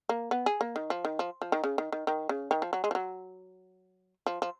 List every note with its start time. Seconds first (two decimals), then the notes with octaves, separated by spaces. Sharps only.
0.09 A#3
0.31 B3
0.46 G#4
0.61 A#3
0.76 D#3
0.90 F3
1.05 D#3
1.19 F3
1.42 F3
1.52 D#3
1.64 C#3
1.78 D#3
1.92 D#3
2.07 D#3
2.29 C#3
2.51 D#3
2.62 F3
2.73 F#3
2.84 G#3
2.91 F3
2.95 F#3
4.26 F3
4.42 F3